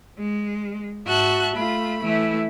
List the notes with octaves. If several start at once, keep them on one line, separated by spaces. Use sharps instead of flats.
G#3
G#2 F#4 E5 A5 F#6
A3 F4 B5
E3 A3 E4